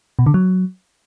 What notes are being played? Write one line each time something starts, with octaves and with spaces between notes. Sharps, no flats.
B2
D3
F#3